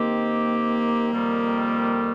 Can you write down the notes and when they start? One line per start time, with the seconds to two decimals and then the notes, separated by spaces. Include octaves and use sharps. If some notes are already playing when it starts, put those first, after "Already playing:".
Already playing: D#3 A#3 C4 G4
1.12 F2 D#3 G3